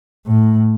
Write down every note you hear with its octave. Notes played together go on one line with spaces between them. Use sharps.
A2